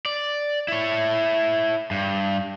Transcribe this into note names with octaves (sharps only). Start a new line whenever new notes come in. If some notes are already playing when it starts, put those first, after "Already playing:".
D5
E4 C#5
G2